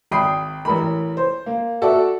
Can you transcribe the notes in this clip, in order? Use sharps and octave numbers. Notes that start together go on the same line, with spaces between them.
G#1 G5 B5 D#6 C7
A1 A#4 B5
C5
A#3
F#4 A4 D5 E5